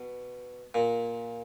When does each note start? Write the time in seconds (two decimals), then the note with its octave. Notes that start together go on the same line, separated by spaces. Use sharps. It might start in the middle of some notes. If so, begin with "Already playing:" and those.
Already playing: B2
0.74 A#2